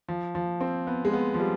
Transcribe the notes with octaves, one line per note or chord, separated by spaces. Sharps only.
F3
F3
C4
B3
G#3
B3
F3
G3